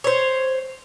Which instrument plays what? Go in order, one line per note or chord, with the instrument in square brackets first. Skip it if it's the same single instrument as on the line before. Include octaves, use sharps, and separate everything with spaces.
[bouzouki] C5 C#5